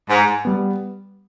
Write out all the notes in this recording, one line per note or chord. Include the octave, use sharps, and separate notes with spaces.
G#2
G3 B3